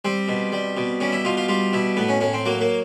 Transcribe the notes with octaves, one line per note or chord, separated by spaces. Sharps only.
G3 C4
B2
G3
B2
G3 C#4
E4
B2 F4
F4
G3 F4
B2 E4
A2 B3
C#4
A2 C#4
C4
F#3 A#3
A#3